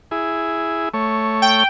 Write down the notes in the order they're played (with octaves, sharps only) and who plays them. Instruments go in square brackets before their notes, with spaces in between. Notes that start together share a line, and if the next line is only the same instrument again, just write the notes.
[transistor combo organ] E4 G#4
A3 C#5
[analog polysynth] G5